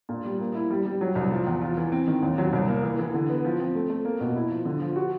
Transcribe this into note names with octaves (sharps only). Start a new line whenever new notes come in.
A#2
G3
A#3
E4
G3
G3
F#3
C2
F3
E2
F4
E3
C4
D#3
D#2
F#3
C2
A#3
E3
E3
D3
B3
F3
C4
A3
A3
A#3
B2
E4
F3
D3
F3
F#4